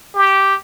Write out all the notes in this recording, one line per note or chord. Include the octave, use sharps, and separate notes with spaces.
G4